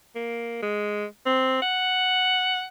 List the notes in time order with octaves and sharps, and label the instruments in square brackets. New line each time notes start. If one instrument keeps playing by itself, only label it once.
[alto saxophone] A#3
G#3
C4
F#5